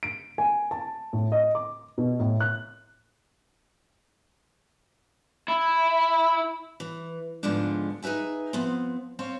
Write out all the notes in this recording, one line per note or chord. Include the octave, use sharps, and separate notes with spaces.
D7
G#5
A5
A2
D#5
D6
B2
A2
F#6
E4
E3
G#2 D3 F3 G#3 B3 D4
D#4 G#4 B4 E5 G#5
F3 B3 C4
C4 C#5 F5